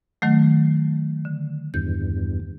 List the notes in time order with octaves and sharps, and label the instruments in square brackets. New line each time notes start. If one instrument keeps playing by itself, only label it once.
[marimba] D#3 F#3 A3
D3
[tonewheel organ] E2 G2 [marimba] G6